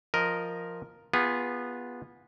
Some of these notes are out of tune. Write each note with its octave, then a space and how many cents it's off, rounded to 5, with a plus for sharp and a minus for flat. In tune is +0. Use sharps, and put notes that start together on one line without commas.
F3 +0 A#4 +0 D#5 +0
B3 -10 F4 +0 G#4 -25